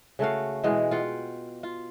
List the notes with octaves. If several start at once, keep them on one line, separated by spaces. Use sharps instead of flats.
C#3 A3 F#4 F5
B2 E3 G#3
F4 F#5 G5
F4